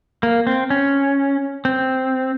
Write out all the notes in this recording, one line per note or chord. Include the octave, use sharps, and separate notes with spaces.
A#3
C4
C#4
C4